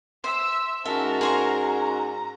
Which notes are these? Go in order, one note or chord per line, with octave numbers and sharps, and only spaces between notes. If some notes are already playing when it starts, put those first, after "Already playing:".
C5 E5 E6
G#2 C#4 F#4 A#4 E5 A5
G#4 C5 A#5 C#6